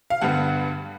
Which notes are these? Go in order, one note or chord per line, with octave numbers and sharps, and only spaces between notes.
F5
G2 D3 G3 B3 F#5